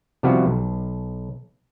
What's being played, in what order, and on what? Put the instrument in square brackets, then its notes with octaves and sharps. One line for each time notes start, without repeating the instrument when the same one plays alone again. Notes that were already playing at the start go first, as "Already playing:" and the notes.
[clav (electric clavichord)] C3 F3 G3 B3 E4 F#4
B1